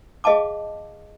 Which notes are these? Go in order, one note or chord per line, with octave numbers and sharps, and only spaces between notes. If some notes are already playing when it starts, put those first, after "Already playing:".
G#4 D#5 F5 A5 D6